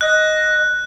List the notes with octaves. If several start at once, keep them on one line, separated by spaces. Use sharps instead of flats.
D#5 F#6